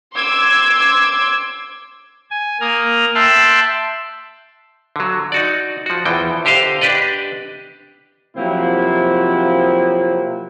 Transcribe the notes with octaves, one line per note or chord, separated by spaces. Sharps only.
C6 D6 E6 G#6
G#5
A#3 A#5 D#6 F6
E5 G5 A5 C6 E6 F#6
D3 F#3
D#4 F#4 D5
F3 F#4
E2 E3 F3 G5
D3 G4 C5 D#5 F5
D4 G4 B4 D5 D#5
C3 F3 F#3 A#3 C4 E4